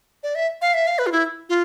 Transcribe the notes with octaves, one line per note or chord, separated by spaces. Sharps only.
D5
E5
F5
E5
F5
B4
F4
E4
F4